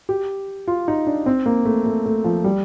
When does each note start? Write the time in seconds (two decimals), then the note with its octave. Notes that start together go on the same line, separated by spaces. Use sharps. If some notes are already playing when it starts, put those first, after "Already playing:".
0.09 G4
0.68 F4
0.88 D#4
1.07 D4
1.26 C4
1.46 A#3
1.65 A3
1.86 A3
2.06 A3
2.24 F3
2.44 G3